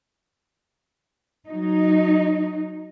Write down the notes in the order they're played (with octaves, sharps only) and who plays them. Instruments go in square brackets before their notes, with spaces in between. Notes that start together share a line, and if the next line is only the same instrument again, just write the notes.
[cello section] F#3 D#4